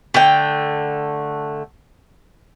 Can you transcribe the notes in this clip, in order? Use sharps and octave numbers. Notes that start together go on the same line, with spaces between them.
D3 A3 G5